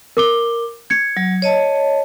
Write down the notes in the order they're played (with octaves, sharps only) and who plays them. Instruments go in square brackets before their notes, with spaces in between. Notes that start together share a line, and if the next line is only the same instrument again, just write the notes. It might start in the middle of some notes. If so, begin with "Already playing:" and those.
[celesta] A#4 D6 G7
G#6 C#7
[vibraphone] F#3
C#5 D#5 A5